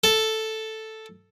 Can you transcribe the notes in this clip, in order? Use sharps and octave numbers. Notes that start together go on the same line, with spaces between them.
A4